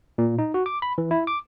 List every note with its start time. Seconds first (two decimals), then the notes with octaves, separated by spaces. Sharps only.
0.18 A#2
0.39 D#4
0.54 F#4
0.66 D6
0.82 B5
0.98 E3
1.11 E4
1.27 D6